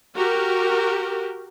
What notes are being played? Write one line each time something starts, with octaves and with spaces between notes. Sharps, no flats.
F#4 G4 A#4